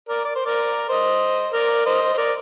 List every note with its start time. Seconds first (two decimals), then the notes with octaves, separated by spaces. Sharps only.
0.09 A#4 D5
0.25 D5
0.35 C5
0.46 A#4 D5
0.89 C5 D#5
1.53 A#4 D5
1.86 C5 D#5
2.14 C5
2.18 A#4 D5